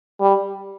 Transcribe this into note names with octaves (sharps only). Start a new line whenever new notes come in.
G3